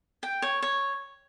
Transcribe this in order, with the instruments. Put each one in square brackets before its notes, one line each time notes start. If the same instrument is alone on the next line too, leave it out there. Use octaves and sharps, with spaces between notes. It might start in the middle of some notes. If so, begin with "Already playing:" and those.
[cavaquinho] G5
C#5
C#5